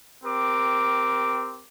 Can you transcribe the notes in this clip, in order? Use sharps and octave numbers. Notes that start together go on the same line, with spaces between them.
C4 G4 A#4 D6